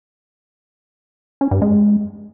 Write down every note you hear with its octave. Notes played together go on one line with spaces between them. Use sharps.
C#4
G2
G#3